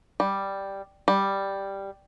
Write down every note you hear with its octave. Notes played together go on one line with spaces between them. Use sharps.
G3
G3